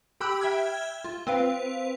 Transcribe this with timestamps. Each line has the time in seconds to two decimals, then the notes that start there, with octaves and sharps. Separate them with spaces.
0.20 G4 G5 B5 E6 F#6
0.41 E5 G5 F6 G#6
1.04 F4
1.27 C4 B4 F5